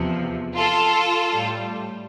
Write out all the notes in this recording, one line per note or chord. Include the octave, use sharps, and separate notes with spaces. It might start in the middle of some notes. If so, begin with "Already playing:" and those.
Already playing: E2 C3 F3
F4 A4
A2 G3